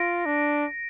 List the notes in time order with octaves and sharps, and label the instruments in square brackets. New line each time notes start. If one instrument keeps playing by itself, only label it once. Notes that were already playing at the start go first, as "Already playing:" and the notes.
Already playing: [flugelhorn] F4 [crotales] A#6 D7
[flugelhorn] D4